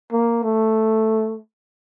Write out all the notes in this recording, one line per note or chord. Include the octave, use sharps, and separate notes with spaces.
A#3
A3